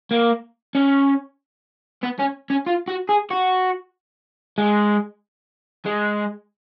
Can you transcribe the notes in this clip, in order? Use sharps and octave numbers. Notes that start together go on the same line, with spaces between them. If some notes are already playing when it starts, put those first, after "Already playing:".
A#3
C#4
B3
C#4
C#4
F4
F#4
G#4
F#4
G#3
G#3